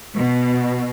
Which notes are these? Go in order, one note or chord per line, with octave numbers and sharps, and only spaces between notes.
B2